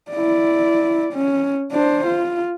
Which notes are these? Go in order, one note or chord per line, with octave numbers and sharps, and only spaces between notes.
E4 D5
C#4
D4 C5
F4